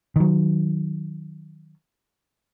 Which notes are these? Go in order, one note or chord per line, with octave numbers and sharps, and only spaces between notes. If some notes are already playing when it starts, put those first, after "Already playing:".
D#3 F#3